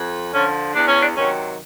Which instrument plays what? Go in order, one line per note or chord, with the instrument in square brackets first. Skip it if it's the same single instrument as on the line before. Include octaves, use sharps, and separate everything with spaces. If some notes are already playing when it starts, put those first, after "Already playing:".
Already playing: [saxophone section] F2
D3 F3 C#4
E2 D4
C#4
D4
C3 D#3 F#3 C#4